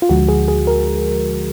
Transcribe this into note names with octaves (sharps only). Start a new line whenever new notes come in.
F4
D2 D3 F3 G#3 F#4
G#4
G#4
A#4